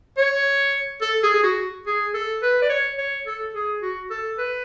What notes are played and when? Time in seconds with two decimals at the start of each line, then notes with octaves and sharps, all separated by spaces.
0.17 C#5
1.01 A4
1.23 G#4
1.34 G#4
1.43 F#4
1.87 G#4
2.14 A4
2.42 B4
2.62 D5
2.70 C#5
2.98 C#5
3.27 A4
3.54 G#4
3.82 F#4
4.11 A4
4.38 B4